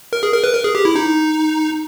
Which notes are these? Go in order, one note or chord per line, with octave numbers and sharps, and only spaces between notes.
A#4
G#4
A#4
B4
A#4
G#4
G4
E4
D#4